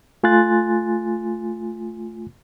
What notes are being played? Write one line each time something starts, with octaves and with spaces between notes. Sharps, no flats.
A3 F4 G#5 C6 F#6 A6